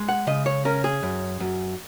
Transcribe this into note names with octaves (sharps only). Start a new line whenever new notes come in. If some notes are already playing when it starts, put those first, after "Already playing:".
Already playing: G#3
F#5
C#3 D#5
C#5
C#4 A#4
G#4
F#2
F#2